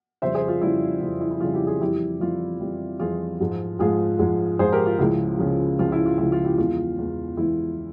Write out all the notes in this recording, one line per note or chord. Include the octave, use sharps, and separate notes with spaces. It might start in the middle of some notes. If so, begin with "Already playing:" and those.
F2 C#3 G3 C5 E5
G#4 C5
F4
F2 C#3 G3 E4
F2 C#3 G3 E4
E4
E4
F2 C#3 G3 F4
E4 G4
F4 G#4
F2 E3 G3 E4 G4
F2 E3 G3 F4
F2 E3 G3
F2 E3 G3 F4 G#4
G#2 F3 G#3
G#2 F3 G#3 F4 G#4
G#2 F3 G#3
G#2 F3 G#3 G#4 C5
G4 A#4
F4
C#2 C#3 F3 G#3 E4
C#2 C#3 F3 G#3
C#2 C#3 F3 G#3 F4
E4
F4
C#2 C#3 F3 G#3 E4
F4
E4 G4
E2 E3 G#3 F4
E2 E3 G#3
E2 E3 G#3 E4